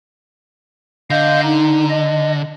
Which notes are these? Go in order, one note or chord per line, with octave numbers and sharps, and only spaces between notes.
D3 D#5 F5 G6
D#4
D#5